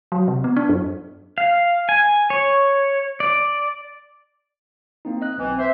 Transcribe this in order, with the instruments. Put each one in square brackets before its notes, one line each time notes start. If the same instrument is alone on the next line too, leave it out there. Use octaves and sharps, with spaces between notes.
[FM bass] F#3
C3
B3
D4
F#2
[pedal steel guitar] F5
G#5
C#5
D5
[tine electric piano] A#3 C4 D#4
D#5 F#6
[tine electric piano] B1 C4 [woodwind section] E3
[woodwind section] C5 E5